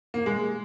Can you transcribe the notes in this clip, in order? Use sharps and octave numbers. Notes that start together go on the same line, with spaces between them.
A#3
G#3